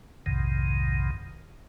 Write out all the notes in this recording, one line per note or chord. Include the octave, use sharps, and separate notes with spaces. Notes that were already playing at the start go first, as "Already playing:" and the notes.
B1 F2 G#2 C3 D#3